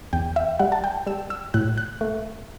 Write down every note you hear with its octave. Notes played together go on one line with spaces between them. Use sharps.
E2 G5
E5
G3 F#5
A5
G5
G3 E6
E6
A2 F#6
F#6
A3